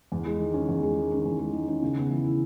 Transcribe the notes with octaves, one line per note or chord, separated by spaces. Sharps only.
E2
G#3
D#3
C#4
E2
G#3
D#3
C#4
E2
G#3
D#3
C#4
C#3
B3
E3
E4